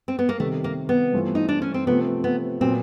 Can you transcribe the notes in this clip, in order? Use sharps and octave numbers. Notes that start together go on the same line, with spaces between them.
C4
B3
A#3
C3 D#3 G3 A3
A#3
B3
G2 E3 A3 C4 F4
D#4
D4
C#4
C4
C3 F3 A3 B3 C4
B3
A#2 F#3 B3 C4